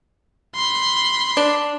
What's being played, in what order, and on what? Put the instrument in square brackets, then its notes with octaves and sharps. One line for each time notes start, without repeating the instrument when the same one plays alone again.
[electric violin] B5 C6
[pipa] D4